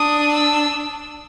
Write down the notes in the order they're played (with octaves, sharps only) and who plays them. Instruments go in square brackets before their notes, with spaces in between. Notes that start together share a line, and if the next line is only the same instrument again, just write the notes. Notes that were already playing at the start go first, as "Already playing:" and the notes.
Already playing: [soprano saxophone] D4 [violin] D#6
[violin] E6